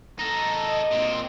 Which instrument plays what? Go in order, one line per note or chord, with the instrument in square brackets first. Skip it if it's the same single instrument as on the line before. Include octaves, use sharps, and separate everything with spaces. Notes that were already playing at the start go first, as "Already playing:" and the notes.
[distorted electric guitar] D#4 A4 [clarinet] A#5
[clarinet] D#5
[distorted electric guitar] A#2 C4